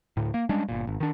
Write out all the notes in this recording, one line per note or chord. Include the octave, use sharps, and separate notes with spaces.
D2 A2
A#3
G3 G#3 C#4 D4
G1 A#2
G#1
D#3 D4